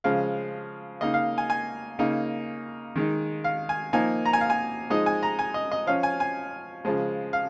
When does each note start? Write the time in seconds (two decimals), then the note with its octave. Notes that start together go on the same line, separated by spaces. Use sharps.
0.04 C#3 F3 G#3 F5
1.01 C#3 A#3 D#4 D#5
1.14 F5
1.38 G#5
1.50 G#5
1.99 C#3 A#3 D#4
2.96 D#3 G#3 D#4
3.44 F5
3.69 G#5
3.93 F3 A#3 D#4 G#5
4.25 A#5
4.33 G#5
4.41 F5
4.50 G#5
4.90 F3 G#3 D#4 D#5
5.06 G#5
5.23 A#5
5.39 G#5
5.54 D#5
5.72 D#5
5.87 F3 C#4 F5
6.03 G#5
6.20 G#5
6.85 C#3 F3 G#3
7.33 F5